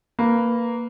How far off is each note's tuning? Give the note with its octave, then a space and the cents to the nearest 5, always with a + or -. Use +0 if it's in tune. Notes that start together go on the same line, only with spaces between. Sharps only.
A#3 -10 B4 +0